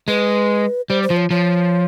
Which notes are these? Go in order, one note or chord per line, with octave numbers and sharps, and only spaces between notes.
G#3 B4
G3 C5
C5
F3
C#5
F3 C#5